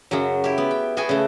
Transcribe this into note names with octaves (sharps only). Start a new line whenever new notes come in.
F#2 C#3 F#3
E4 G4
B3
G5
B3 F#4 G#4 G5 G#5
C#3 A3